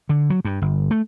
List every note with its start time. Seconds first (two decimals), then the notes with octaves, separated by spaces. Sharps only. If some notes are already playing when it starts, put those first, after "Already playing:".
0.09 D3
0.30 F#3
0.45 G2
0.62 G1
0.91 A3